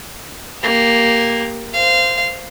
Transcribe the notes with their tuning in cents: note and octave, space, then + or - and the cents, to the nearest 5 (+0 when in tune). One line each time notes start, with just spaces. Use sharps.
A#3 +0 G4 +0
C5 -15 F5 -15